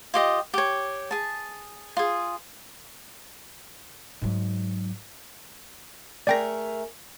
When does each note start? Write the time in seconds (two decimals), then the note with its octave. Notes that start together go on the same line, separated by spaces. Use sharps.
0.14 F4 G4 D#5
0.54 G4 C#5
1.11 G#4 A5
1.97 F4 G#4
4.22 G#2 F#3
6.27 A3 G#4 A#4 D5 G5 A#6